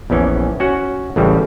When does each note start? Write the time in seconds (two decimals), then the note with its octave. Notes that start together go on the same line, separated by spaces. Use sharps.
0.10 A#1 E2 E3 C#4
0.60 C#4 F#4 F#5
1.16 A1 A2 C#3 E3 G3